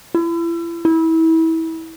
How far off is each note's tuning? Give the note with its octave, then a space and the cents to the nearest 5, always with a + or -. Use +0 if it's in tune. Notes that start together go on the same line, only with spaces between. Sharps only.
E4 +35
E4 -25